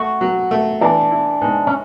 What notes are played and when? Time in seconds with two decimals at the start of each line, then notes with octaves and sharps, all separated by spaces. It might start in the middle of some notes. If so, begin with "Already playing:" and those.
Already playing: A3 F#4
0.21 F#3
0.51 A3
0.81 E3 D4
1.11 E4
1.41 G#2
1.67 C#4